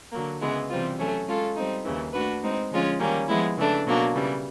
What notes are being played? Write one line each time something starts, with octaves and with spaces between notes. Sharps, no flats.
D3 F#3 A#3
C#3 E3 G#3 B3
C3 E3 G3 C4 F4
F#3 A3 C#4
G#3 C#4 F4 A4
G3 C4 D#4
D#2 C#3 E3
A3 D4 F#4 B4
G#3 C4 D#4
D3 F3 G#3 C#4 F4
D#3 G3 A#3 C#4
F3 G#3 B3 E4
C#3 E3 A3 D4
B2 F#3 A#3 D4
C#3 E3 G3